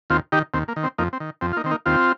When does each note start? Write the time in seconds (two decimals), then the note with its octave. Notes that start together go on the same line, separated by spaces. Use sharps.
0.10 D#2 C4 F4
0.32 D#3 D#4 G4
0.54 D#2 C4
0.68 A#3
0.76 D#3
0.83 C4
0.98 F2 A#3 D#4
1.13 C4
1.20 D#3
1.41 F2 C4
1.53 F4
1.57 A#3 D#4
1.64 D#3 C4
1.71 A#3 D#4
1.86 D#2 C4 F4